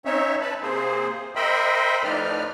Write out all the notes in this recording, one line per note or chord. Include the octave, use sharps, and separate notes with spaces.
C4 C#4 D#4 C#5 E5
B4 A5 B5
C3 A#3 C4 G#4 C5
A#4 C5 D#5 E5 G5 B5
A2 F3 D#4 B4 D5 F6